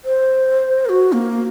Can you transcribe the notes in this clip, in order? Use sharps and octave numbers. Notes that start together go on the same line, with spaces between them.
C5
A#4
F#4
A#3